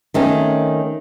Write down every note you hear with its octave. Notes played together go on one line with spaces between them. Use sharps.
D#3 A3 C4 C#4